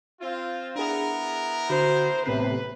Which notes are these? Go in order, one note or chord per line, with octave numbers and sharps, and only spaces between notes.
C4 F4
B3 D4 E4 G#4 A#4
D3 F#4 C5 B5
A1 A2 C3 B3 B4 C7